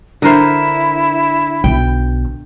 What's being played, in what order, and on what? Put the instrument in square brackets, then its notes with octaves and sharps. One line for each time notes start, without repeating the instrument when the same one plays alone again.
[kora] D3 A#4 C5 [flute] E4
[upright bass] B1 [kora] G5